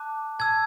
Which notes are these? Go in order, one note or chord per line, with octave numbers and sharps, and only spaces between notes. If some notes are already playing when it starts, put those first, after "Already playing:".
Already playing: A5 D6 F#6
A5 E6 G#6